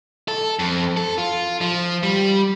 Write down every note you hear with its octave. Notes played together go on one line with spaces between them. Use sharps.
A4
F2
A4
F4
F3
G3